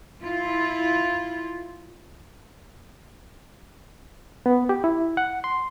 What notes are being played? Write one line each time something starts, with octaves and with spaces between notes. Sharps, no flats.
E4 F4
B3
G4
E4
F#5
C6